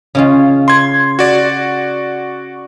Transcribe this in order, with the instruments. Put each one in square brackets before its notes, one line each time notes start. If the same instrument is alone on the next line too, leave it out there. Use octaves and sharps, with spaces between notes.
[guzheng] C#3 C#4 F4
[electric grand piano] C6 G#6
F#4 D5